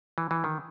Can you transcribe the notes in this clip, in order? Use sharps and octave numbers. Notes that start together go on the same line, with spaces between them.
E3
E3
D#3